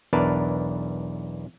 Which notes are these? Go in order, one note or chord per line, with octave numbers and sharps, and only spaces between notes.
B1 E2 D4 A#4 B4 A5